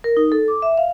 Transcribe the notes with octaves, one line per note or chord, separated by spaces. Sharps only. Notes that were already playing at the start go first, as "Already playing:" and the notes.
A#4
D#4
A4
D6
E5
F5